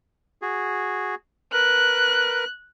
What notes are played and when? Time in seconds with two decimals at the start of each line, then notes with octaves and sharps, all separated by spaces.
0.42 F#4 G#4
1.53 A#4 B4 F#6